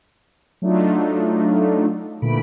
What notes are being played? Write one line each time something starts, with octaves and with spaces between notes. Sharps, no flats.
F#3 A3 D4 D#4 F4
A#2 D3 E3 A3 B5 D7